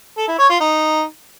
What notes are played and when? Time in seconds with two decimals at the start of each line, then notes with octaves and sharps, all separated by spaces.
0.17 A4
0.28 E4
0.39 C#5
0.49 F4
0.60 D#4